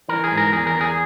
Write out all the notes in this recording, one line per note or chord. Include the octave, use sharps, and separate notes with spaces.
E3 A#4
G#4
G#2
A#4
E2 G#4
A#4
E2
G#4